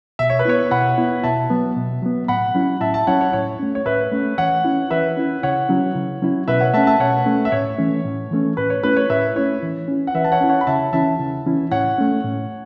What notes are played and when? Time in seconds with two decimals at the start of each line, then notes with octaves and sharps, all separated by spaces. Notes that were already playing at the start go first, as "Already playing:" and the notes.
0.19 B2 E5
0.30 C#5
0.39 B4
0.45 B3 E4 C#5
0.71 B2 F#5 B5
0.98 B3 E4
1.23 B2 E5 A5
1.50 F#3 B3
1.76 B2
2.02 F#3 B3
2.28 A2 F#5 B5
2.55 F#3 C#4 E4
2.81 A2 E5 A5
2.94 E5 A5
3.07 F#3 C#4 E4 C#5 F#5
3.21 C#5
3.33 A2 C#5
3.59 A3 C#4
3.75 C#5
3.86 A2 B4 E5
4.12 A3 C#4
4.38 E3 C#5 F#5
4.64 C#4 E4
4.90 E3 B4 E5
5.17 C#4 E4
5.43 C#3 C#5 F#5
5.69 F#3 C#4 E4
5.95 C#3
6.22 F#3 C#4 E4
6.48 B2 B4 E5
6.61 C#5 F#5
6.74 A3 C#4 E5 A5
6.87 E5 A5
7.00 B2 C#5 F#5
7.26 A3 C#4
7.45 E5
7.52 A2 C#5
7.78 E3 A3 C#4
8.05 A2
8.31 E3 A3 C#4
8.57 A2 B4
8.70 C#5
8.83 A3 C#4 E4 B4
8.97 C#5
9.10 A2 B4 E5
9.36 A3 C#4 E4 C#5
9.62 E3
9.88 C#4 E4
10.07 F#5
10.15 E3 B4 E5
10.24 A5
10.32 C#5 F#5
10.41 C#4 E4
10.49 C#5 F#5
10.61 B5
10.67 C#3 E5 A5
10.93 E3 C#4 E4 E5 A5
11.19 C#3
11.46 E3 C#4 E4
11.71 A2 C#5 F#5
11.98 A3 C#4
12.24 A2